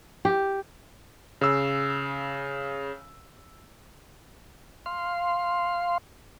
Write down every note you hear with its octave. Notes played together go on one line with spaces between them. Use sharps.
G4
C#3 E6
F5 C6